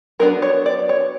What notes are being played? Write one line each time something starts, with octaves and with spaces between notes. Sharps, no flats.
F#3 B3 D4 A#4
C#5
D5
C#5